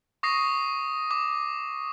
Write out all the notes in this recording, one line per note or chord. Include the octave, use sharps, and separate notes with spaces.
C#6 D#6 A#6 C7
D6